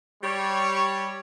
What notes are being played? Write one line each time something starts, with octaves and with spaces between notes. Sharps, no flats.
G3 C#5